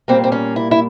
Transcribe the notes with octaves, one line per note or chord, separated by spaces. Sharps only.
A#2 G3 A#3 C4
C4
C#4
E4
E4